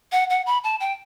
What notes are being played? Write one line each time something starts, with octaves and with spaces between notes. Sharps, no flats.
F#5
F#5
B5
A5
G5